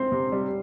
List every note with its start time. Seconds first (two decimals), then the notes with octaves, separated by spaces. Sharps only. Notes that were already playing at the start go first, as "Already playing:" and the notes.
Already playing: C4 C6
0.12 C3
0.32 G3